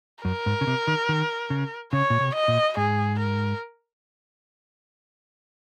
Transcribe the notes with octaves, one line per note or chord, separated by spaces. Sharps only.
F#2 A#4
G#2
C#3
C3
D#3
D#3
C#3
C#3 C#5
A#2
C3
D#5
A#2
G#2 G#4
A#4